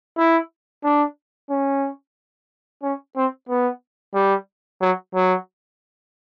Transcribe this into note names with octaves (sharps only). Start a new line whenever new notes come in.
E4
D4
C#4
C#4
C4
B3
G3
F#3
F#3